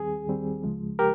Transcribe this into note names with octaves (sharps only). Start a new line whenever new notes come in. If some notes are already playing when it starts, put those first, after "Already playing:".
Already playing: D#2 D#3 G3 C4 G#4
D#2 D#3 G3 C4
C#2 C#3 F3 G#3
G4 A#4